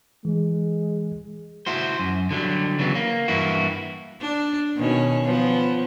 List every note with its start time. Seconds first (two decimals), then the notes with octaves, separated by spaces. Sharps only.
0.25 E3 G#3
1.66 E4 F#4 C5
2.00 F#2
2.31 D3 F#3 G3
2.79 C#3 E3 F#3 B3
2.95 A#3
3.28 G2 E3 A#3 E4 F#4
4.21 D4
4.76 B2 D#3 C#4
5.24 F3 B3 C#4